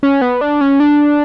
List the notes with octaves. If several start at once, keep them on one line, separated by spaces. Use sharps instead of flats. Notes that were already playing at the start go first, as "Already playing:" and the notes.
C#4
B3
D4
C#4
D4